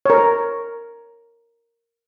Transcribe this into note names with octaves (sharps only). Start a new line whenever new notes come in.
A#4 C#5